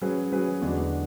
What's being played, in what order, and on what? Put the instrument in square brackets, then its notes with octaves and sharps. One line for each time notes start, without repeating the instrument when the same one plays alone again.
[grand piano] F#3 C#4 G#4 B4
F#3 C#4 G#4 B4
E2 D3 G#3 D4 F#4